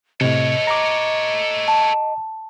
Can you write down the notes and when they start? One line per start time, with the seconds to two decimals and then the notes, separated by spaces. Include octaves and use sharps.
0.21 A2 C3 A4 C#5 D#5
0.67 A#5 D6
1.68 A5